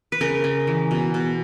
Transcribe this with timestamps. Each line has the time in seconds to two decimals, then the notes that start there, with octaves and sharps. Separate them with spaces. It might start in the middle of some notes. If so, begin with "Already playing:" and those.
0.12 B4
0.21 C#3 A#4
0.44 C#3
0.67 E3
0.91 B2
1.14 B2